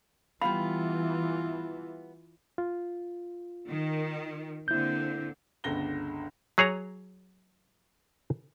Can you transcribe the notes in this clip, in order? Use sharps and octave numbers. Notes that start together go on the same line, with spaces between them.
E3 G3 B3 F4 F5 B5
F4
D#3
D3 A#3 C4 E4 G6
G1 C#2 D3 A#6 G7
F#3 G#4 C#5 A#5